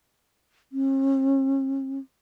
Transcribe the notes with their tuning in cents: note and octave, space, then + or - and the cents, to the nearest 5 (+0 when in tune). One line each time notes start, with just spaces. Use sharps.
C#4 -45